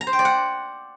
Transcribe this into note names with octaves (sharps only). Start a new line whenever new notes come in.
A#5
C5
G5
D5
F#5